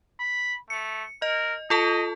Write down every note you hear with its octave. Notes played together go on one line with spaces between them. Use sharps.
B5
A3 C#7
A#4 D#5
F4 A4 D#5 A5